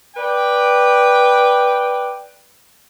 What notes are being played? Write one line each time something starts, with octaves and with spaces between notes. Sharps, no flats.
B4 D5 G5